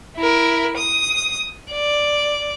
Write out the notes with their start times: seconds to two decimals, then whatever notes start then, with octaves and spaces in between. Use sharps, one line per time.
0.17 E4 A#4
0.77 D#6
1.71 D5